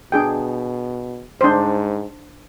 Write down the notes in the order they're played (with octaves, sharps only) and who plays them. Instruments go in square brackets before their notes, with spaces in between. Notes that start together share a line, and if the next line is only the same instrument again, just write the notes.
[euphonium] B2 [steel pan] D4 G#4 G5
[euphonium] G#2 [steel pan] D4 C5